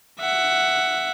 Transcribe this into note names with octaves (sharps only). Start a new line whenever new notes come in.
E5 F#5